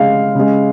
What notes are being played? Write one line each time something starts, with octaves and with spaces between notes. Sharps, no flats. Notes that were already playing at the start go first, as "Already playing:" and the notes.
Already playing: C#3 G#3 F5
C#3 G#3